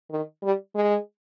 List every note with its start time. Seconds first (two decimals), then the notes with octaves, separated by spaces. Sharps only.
0.11 D#3
0.43 G3
0.76 G#3